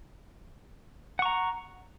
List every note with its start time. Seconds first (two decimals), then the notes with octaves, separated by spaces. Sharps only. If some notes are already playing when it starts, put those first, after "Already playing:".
1.19 F#5
1.22 C#6
1.25 A#5